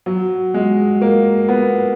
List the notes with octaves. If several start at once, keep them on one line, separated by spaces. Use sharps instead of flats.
F#3
G#3
A#3
B3